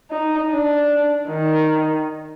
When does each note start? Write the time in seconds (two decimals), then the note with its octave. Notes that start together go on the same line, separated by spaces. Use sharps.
0.11 D#4
0.51 D4
1.29 D#3